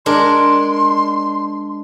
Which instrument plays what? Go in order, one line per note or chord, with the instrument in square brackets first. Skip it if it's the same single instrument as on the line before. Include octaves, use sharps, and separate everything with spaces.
[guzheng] G#3 D4 A#4 [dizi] C6